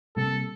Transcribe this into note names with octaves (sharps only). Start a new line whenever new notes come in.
C3 G3 A#3 A4